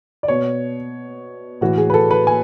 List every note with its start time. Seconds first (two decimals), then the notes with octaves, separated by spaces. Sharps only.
0.23 D5
0.28 B2 C#5
1.61 A2 E3 F#4
1.78 G#4
1.90 B4
1.94 A4
2.11 B4
2.27 G#5